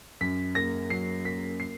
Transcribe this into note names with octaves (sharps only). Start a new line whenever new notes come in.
F#2 B6
A#3 A#6
F#3 C7
A#3 B6
C7